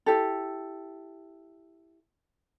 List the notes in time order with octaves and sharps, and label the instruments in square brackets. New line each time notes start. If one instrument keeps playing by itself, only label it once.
[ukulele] E4 G4 A4